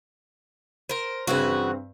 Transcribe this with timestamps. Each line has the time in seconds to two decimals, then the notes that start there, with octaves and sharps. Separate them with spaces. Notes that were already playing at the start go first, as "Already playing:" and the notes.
0.89 A#4 C5
1.27 G2 C#3 E3 C4 F#4